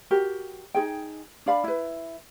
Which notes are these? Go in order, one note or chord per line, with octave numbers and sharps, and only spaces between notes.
F#4 G4 A#4
D#4 F#4 G#4 G5
D4 D5 F5 B5
E4 B4